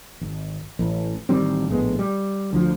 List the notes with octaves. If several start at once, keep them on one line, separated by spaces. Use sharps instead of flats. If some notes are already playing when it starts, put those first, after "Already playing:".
G#1
A1
A1 D#3 G3 C4
A#1 A2 G#3 B3
G3
D2 F3